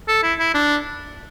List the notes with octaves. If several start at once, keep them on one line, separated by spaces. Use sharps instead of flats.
A4
E4
E4
D4